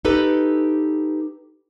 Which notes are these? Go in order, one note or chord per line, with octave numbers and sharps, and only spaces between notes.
D#4 G4 A4 B4